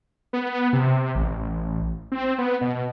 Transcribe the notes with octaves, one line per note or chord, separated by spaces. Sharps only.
B3
C3
A1
C4
B3
B2